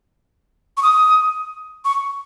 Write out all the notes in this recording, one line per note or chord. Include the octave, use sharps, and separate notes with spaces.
C#6
D#6
C#6